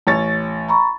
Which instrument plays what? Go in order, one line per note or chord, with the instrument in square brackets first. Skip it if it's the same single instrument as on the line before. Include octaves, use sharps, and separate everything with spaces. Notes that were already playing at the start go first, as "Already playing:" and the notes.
[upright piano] A1 C#5 A6
[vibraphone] A#5 B5 C#6